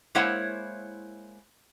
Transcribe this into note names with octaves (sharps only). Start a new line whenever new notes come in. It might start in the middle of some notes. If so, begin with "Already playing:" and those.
G#3 A#3 E4 C5 C#5 F#5